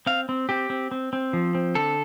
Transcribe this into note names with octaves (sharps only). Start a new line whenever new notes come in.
C4 F5
C4
C4 G4
C4
C4
C4
F3
C4
D3 A4